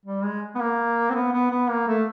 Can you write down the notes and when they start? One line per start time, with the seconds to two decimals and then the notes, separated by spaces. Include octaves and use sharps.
0.06 G3
0.23 G#3
0.55 B3
0.60 A#3
1.10 C4
1.14 B3
1.32 B3
1.51 B3
1.69 A#3
1.87 A3